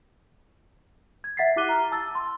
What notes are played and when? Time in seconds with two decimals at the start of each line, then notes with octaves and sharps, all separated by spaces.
1.24 G#6
1.37 E5 F#5 A6 B6 C7
1.56 E4 G4 D6 F#6 D#7 G7
1.69 A#5 F6
1.92 A5 E6 A6
2.11 A5 C6